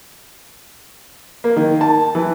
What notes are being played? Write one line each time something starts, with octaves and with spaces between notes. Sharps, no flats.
A#3
D#3
A5
E3